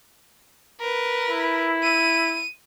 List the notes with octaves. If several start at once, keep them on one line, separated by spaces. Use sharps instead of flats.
A#4 B4
E4
D#7